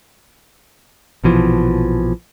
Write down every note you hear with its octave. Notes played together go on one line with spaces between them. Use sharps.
A#1 B2 E3 F3